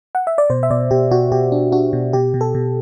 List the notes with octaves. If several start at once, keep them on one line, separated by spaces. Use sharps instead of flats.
F#5
E5
D5
B2 C5
E5
B2 D5
B2 G4
B2 F#4
B2 G4
D4
D4 F#4
B2
B2 G4
B2
A4
B2